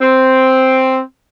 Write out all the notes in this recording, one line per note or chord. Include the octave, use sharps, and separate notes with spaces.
C4